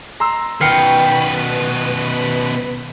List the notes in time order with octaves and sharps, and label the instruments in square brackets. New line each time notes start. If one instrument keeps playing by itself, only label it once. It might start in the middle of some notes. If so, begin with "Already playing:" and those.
[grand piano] A#5 C6 E6
[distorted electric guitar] B2 D#3 [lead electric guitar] B4 [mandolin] F#5 G5 F6 [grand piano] C7 C#7